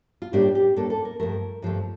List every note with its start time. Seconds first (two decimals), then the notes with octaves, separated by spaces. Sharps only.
0.22 F4
0.33 A2 G3 A#3 D4 G4
0.55 G4
0.76 A2 G3 A#3 D4 A4
0.90 A4
1.05 A#4
1.20 G2 F3 A3 A#4
1.62 G2 F3 A3